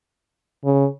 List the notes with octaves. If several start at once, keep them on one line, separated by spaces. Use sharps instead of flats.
C#3